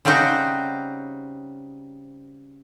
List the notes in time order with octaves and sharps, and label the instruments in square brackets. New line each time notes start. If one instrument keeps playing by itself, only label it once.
[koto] C#3 G3 C4 D#4 F#4 C5